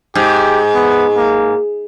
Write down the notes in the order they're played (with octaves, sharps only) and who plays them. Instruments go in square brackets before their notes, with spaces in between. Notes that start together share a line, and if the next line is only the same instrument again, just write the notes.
[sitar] G#2 [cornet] G4
[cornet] B3
A#3